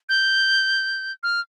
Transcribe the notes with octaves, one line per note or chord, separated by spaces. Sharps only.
G6
F6